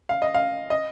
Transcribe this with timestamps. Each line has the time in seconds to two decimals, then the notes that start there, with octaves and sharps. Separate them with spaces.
0.09 F5
0.22 D#5
0.34 F5
0.70 D#5